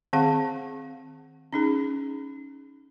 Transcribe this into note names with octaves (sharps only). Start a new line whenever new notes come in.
D#3 C4 G#4 F5 F#5
C#4 D#4 G#4